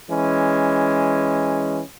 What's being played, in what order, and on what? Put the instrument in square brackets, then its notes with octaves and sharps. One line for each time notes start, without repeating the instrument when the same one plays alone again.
[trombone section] E3 G#3 C#4